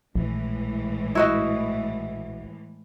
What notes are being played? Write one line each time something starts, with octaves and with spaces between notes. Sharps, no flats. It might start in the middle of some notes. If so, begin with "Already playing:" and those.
A#1 A2 E3 G#3
E4 F#4 D#5